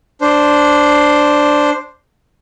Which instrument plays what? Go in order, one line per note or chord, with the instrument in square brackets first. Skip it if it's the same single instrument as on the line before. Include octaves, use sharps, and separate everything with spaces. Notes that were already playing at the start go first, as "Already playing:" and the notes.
[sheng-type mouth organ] D4 C5